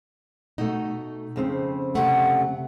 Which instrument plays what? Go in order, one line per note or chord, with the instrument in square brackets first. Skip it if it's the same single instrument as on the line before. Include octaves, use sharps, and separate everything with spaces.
[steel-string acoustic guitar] B2 A3 [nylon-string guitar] D#4
[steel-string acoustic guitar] F2 C#3 C4
[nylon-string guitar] C3 A3 [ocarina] F#5